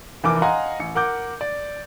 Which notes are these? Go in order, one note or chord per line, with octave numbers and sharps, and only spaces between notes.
F1 E2 E3 A#4 D6
D#5 F5 F#5 G#5 A#5 C6
A1 C#7
A#4 F#5 D6 G6
D5